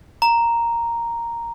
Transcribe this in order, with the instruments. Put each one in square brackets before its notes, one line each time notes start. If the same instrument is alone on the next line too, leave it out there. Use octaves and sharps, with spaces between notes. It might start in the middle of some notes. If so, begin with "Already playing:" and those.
[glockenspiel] A#5